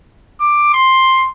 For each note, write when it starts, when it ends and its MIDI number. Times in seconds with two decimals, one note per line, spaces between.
0.41 0.71 86
0.73 1.28 84